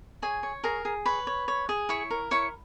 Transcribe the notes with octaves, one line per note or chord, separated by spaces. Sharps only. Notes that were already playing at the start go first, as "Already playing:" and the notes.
G#4 C#5 G#5
C#5
G#4 A#4 A#5
G#4
B4 C#5 B5
C#5
C#5
G#4
E4 C#5 C#6
A#4
E4 C#5 C#6